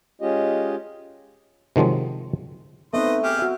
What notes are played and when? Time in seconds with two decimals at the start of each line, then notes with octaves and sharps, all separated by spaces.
0.22 G#3 C#4 F4 G4 D#5
1.76 C3 D#3 F3 F#3 G#3
2.94 A3 B3 C4 D#4 B4 D#5 C6
3.23 G4 G#4 F6
3.39 F#4 E5